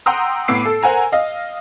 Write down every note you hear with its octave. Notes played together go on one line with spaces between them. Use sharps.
F#5 G5 A#5 C6 D#6 E6
A2 B3 D6 E6 C7 D7
A4
A#4 C5 F#5 G#5 A#5
D#5 F5